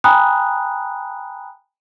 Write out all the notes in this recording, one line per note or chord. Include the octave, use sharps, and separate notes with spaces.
G5 G#5 A#5 B5 D#6 F#6